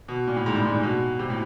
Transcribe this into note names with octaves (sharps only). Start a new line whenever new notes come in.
B2
A#2
A2
G#2
G2
G#2
A#2
B2
C3
A2